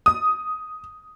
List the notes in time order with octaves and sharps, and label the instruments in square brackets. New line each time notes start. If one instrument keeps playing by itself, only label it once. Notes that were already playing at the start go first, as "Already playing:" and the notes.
[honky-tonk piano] D#6